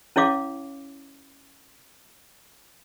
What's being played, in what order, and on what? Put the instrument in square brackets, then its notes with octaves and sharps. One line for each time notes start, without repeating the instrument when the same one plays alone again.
[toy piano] C#4 E4 C#5 F5 D6